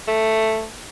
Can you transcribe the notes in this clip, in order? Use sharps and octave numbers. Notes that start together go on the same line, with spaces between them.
A3